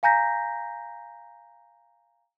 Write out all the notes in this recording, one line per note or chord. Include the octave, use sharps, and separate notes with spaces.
F5 G#5 A#5 G6 A#6 B6